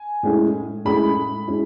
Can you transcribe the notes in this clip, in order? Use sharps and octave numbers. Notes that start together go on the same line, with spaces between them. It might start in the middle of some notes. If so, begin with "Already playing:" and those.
Already playing: G#5
A2 G#3 C#4 E4
A2 G#3 C#4 E4 B5
G#3 C#4 E4